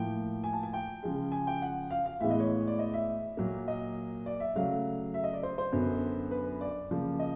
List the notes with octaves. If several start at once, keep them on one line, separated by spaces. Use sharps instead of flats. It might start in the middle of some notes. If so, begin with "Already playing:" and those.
Already playing: A2 F3 A#3 G5
G#5
A5
G#5
G5
C#3 F3 G#3
G#5
G5
F#5
F5
F5
A2 E3 G#3 B3 E5
D#5
C#5
D5
D#5
E5
A#2 F#3 A#3
D#5
D5
E5
C#3 F#3 A3 F5
E5
D#5
D5
C5
C5
F#2 D3 F#3 B3
B4
D5
C#3 F3 A#3
D#5